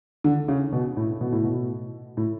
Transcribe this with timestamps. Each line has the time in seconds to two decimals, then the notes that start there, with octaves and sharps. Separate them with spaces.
0.24 D3
0.48 C#3
0.73 B2
0.97 A2
1.21 B2
1.32 A2
1.44 B2
2.17 A2